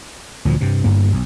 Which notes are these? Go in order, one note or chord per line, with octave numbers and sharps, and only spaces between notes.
D2 A#2 C#3 F3
G2 C3
G1 G2 A#3
B1